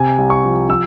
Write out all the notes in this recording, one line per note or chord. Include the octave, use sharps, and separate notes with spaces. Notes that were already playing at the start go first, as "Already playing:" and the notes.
Already playing: C3 G#5
C2
C#6
F3
F3 E6